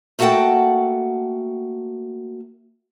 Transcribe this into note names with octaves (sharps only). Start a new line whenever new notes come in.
A3 A#3 F#4 A4 F#5 G5